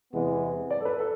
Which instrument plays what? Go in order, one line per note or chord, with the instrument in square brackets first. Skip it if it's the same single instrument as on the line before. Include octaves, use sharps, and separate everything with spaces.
[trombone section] E2 C3 E3 G#3 B3
[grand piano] D5
A4
B4
A4